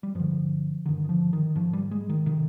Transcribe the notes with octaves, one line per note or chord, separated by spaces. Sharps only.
G3
G2 D3 F3
G2 D3 D#3
D#3
F3
D#3
G#2 F3
G3
G#3
D#3
C3 D#3